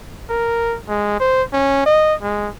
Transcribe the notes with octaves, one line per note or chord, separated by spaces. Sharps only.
A#4
G#3
C5
C#4
D#5
G#3